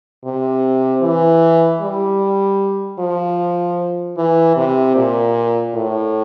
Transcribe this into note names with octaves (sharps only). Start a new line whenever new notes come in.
C3
E3
G3
F3
E3
C3
A#2
A2